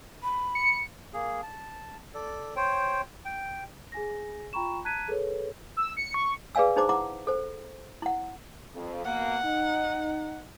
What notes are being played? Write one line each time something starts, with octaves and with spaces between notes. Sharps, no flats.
B5
C#7
A#3 G#4
A5
A4 D5
C5 C#5 G5
G5
G#4 G#5 A#6
F4 G5 A#5 B5 C#6 E7
A5 A#5 F#6 G#6 B6 D#7
G#4 A4 B4 C#5
E6
C#7
C#6
G#4 B4 D5 F5 G#5 E6
D4 D#4 G#4 C5 A#5 D6
E4 F#5 A#5 D6
A4 C5
E4 F#5
F2
B2 A#3 F#5
D#4